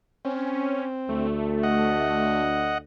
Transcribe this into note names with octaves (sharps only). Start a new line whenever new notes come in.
C4 C#4
D2 A3
D#5 F#5